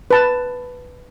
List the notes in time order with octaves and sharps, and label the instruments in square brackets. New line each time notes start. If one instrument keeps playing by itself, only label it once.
[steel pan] B4 A5